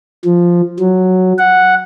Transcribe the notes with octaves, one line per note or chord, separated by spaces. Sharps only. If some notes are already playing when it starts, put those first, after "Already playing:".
F3
F#3
F#5